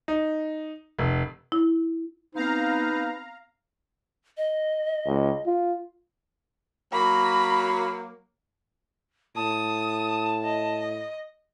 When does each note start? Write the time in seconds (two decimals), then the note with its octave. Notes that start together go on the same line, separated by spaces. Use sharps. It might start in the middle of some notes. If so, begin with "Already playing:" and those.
0.08 D#4
0.99 F1
1.52 E4
2.35 B3 C4 D#4 B4 F5 A#5
4.37 D#5
5.07 C#2
5.46 F4
6.92 F#3 A#3 B5
9.36 A2 A5 D#6
10.45 D#5